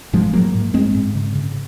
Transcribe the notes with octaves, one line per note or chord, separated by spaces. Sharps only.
G#2 F3 G#3
G#2 F#3 A#3
G#2
G#2 G#3 C4
G#2
C#3
C#3